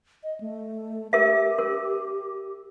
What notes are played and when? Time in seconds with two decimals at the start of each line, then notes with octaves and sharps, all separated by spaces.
0.23 D#5
0.40 A3
1.13 G4 A#4 E5
1.58 A#4